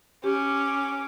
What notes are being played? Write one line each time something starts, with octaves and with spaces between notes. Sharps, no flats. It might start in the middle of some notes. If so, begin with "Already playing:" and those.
C#4 G4 D6